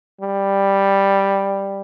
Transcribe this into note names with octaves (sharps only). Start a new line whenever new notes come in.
G3